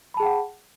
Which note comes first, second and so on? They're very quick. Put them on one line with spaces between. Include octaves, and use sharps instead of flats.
B5 A5 G#4 G5 F#5